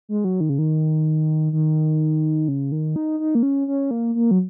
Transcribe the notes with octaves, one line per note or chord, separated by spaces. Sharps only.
G#3
F#3
D#3
C#3
D#3
D#3
C#3
D#3
D#4
D#4
A#3
C#4
C#4
A#3
A#3
F#3